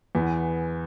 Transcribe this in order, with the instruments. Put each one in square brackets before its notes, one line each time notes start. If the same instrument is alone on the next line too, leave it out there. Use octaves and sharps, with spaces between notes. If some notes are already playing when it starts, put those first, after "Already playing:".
[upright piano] E2 E3 B3